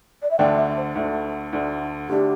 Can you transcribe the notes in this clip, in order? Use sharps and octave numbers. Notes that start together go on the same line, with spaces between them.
D5
E5
D2 D3 A3 D4 G5
E5
C5
D2 D3 A3 D4
D2 D3 A3 D4
D2 D3 A3 D4 G4